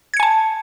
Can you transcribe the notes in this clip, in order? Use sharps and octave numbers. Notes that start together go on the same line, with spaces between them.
G#5 A5 G#6 C#7